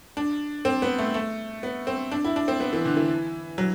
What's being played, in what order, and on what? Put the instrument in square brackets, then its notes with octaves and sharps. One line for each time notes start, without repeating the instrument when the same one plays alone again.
[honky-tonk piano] D4
C4
B3
A3
A3
B3
C4
D4
E4
D4
C4
B3
E3
D3
E3
F#3